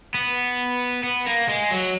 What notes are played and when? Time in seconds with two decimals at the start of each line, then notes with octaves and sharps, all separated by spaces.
0.14 B3
1.03 B3
1.26 A#3
1.48 G#3
1.71 F#3